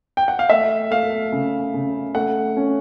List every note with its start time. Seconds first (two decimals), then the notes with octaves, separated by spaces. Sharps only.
0.17 G5
0.28 F#5
0.39 F5
0.50 A3 E5
0.91 A3 F5
1.32 C#3
1.74 C#3
2.15 A3 F#5
2.57 C#4